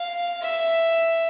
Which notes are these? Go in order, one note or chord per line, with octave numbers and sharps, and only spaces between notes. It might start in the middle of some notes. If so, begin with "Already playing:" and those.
Already playing: F5
E5